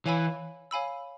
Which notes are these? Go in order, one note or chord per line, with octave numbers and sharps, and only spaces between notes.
E3 C#5 F5 G#5 B5 E6
C#5 F5 G#5 B5 E6